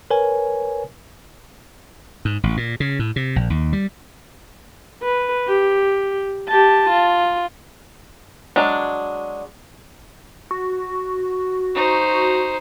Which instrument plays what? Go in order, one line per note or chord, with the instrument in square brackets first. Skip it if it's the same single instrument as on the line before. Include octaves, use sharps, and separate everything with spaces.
[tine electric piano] A#4 B4 C#5 G#5
[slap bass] G#2
A1
A#2
C#3
A2
C3
A#1
D#2
G3
[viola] B4
G4
G4 A5
F4
[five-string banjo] F#3 G#3 D4
[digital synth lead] F#4
[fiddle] D#4 C5